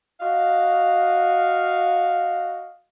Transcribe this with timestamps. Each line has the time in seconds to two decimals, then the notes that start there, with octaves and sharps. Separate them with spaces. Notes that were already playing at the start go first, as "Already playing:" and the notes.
0.20 F#4 D#5 F5